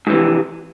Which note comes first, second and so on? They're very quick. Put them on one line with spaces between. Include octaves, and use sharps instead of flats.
G#2 E3 C3 F2